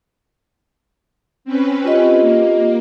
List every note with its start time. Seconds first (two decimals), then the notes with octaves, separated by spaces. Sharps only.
1.45 C4 C#4 B4
1.85 F4 G4 D#5
2.21 A#3